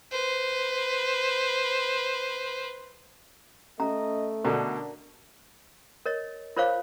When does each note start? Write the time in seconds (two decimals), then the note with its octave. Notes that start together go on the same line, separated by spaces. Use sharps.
0.11 B4 C5
3.80 A3 C#4 D#5 A#5
4.44 B2 D3 D4 A#4 A#5
6.06 A#4 C#5 D#5
6.57 F4 A#4 C5 C#5 F5 D6